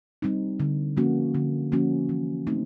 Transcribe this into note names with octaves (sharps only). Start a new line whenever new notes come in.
G3 C4 D#4
D3
F3 A#3 C#4 F#4
D3
F3 A#3 C#4 F#4
E3
A3 C4 D#4